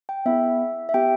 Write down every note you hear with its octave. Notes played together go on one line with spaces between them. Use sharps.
G5
B3 E4 G#4 E5
E5
B3 E4 G4 G5